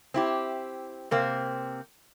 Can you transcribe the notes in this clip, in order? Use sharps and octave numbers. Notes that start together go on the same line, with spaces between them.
C4 E4 G4
C3 A#3 C4